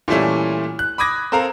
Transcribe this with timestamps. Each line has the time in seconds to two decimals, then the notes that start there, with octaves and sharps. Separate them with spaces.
0.08 A#2 E3 G3 A3 C#4 E4
0.79 F#6
0.98 B5 D6 D#6 G#6 A#6
1.32 C4 A4 A#4 F5 A#5